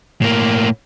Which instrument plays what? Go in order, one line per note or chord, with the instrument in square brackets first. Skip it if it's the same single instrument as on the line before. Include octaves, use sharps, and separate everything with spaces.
[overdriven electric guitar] A2 A#3